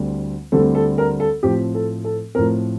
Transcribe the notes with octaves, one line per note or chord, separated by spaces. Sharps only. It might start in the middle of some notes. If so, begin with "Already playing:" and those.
Already playing: D2 D3 G3 C4
D2 D3 G3 C4 A4
A4
A#4
A4
A2 F3 C4 G4
A4
A4
A2 F3 C4 A#4